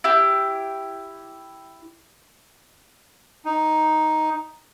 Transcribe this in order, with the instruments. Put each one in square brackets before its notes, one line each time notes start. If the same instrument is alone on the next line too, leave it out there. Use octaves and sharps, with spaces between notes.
[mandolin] E4 G4
[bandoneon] D#4